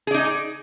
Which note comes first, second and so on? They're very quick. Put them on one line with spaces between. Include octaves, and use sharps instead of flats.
G#4 D5 D#4